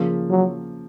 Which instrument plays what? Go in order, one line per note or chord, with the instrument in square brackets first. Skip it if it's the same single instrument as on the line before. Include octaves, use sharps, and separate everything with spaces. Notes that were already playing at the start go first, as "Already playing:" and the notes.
Already playing: [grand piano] C#3 F3 A#3
[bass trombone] F#3